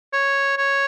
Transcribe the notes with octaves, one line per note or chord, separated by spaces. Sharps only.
C#5
C#5